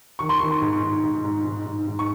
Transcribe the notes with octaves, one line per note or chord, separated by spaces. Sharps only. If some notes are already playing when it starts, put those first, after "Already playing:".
D#3 C#6
C6
D#3 C#6
C6
G#2
G#2
G#2
G#2
G#2
G#2
G#2
C#6